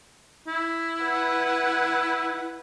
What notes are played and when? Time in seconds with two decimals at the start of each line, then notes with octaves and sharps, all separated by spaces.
0.47 E4
1.04 B4 F#5